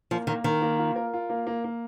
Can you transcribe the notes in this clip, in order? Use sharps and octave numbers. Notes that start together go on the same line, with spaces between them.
F3 A#3
D#3 A#3
D#3 A#4
A#3
F4
A#4
F4
A#3
A#3
A#3